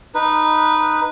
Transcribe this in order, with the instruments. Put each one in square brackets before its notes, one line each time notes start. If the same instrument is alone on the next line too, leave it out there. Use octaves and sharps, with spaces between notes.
[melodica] D#4 B4